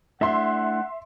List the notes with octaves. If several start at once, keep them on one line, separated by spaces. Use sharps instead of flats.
A3 D4 E4 E5 F#5 C6